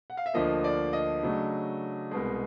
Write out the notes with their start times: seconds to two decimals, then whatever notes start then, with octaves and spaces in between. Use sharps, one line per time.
0.10 F#5
0.17 F5
0.26 E5
0.33 D2 D3 F3 A#3 D#5
0.64 D5
0.93 D#5
1.23 C#3 F#3 A3 D4
2.11 C2 B2 G#3